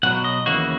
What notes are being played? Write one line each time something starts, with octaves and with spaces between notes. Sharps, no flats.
B1 B2 F#3 F#5
D#5
D#2 C#3 E3 A#3 F#4